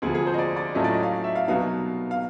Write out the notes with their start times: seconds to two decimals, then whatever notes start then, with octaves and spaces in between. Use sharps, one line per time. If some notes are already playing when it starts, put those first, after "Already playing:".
0.02 D2 C3 F3 G#4
0.15 G#4
0.27 C5
0.34 D#5
0.39 D5
0.56 D5
0.75 A2 F#3 A3 C#4 F4 D#5
0.84 D5
0.94 D#5
1.03 F5
1.24 E5
1.35 F5
1.48 C2 B2 F#3 B3 D#4 F5
2.11 F5